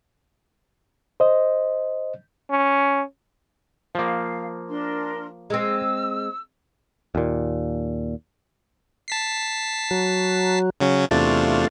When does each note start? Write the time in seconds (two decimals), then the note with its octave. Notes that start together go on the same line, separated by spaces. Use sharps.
1.20 C5 D#5
2.51 C#4
3.95 F3 A#3 F5
4.69 D4 A#4 C6
5.50 G#3 C4 E6
7.15 D#2 A#2
9.08 A5 B6 C7
9.91 F#3
10.80 C#3 F#3 C#4
11.11 E2 C3 A3 D4 F4